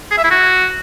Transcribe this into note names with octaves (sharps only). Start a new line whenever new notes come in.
G#4
E5
E4
F#4